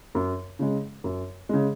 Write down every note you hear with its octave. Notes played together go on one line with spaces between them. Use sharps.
F#2
C#3 G#3
F#2
C#3 G#3